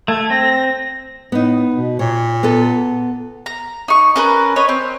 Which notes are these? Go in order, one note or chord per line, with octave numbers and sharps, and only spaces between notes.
A3 G#6
C4 A#6
A2 B3 D#4
B2
A#2 C#5
B3 A4
A#5
D#4 C#6
C#4 A#4 B4
B4 C#5 D#5
C4